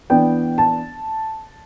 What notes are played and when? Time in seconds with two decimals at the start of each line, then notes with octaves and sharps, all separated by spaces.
0.10 E3 B3 D4 G5
0.58 A5